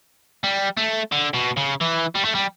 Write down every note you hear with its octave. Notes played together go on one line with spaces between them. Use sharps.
G3
A3
D3
B2
C#3
E3
G3
A3
G3